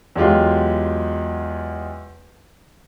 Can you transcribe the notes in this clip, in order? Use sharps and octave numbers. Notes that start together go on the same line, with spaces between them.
E2 F#3 G#3 F4 G4